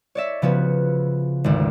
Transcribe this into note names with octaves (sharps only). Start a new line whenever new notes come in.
C#5 D5 E5
C#3 F3 B3 F#4
G#1 D2